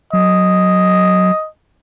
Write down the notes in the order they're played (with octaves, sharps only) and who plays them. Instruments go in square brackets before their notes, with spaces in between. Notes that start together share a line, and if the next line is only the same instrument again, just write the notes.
[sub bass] F#3 [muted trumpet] D#5